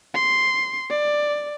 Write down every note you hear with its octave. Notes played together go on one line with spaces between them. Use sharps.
C6
D5